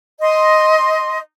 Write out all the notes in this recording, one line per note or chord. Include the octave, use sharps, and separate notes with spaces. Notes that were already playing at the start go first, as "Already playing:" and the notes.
D#5 C6